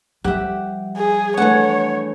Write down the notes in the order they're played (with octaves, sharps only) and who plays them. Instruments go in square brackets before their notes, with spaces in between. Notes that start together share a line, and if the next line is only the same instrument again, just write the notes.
[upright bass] F3 G3 [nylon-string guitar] G4 E5 [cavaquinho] F#5
[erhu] G#4
[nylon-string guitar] E3 A3 D4 [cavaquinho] G#4 F#5 [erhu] C#5